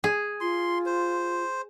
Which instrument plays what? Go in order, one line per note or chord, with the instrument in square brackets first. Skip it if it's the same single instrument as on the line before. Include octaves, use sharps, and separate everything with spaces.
[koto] G#4
[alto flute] F4 [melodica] C6
[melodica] C5